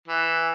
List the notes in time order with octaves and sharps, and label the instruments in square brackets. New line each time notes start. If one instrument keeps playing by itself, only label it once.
[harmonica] E3